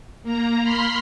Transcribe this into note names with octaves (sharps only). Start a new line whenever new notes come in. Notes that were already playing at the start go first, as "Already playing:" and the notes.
A#3 A#5
B5 C6 F6 C7